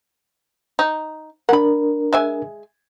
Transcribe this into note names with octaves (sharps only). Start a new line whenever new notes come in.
D#4
D4 A#4 F#5 B5
G#3 E5 G#5